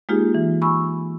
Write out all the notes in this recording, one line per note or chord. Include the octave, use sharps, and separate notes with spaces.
G#3 A#3 D#4 F4 G4 G#4
E3
G#5 B5 C#6 E6